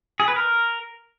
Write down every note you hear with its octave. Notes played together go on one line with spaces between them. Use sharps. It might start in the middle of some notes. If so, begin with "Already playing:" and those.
G#4
B4
A#4